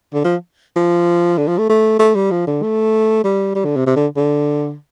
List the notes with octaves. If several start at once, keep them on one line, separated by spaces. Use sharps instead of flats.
D3
F3
F3
D3
F3
A3
A3
A3
G3
F3
D3
A3
G3
G3
D3
C3
C3
D3
D3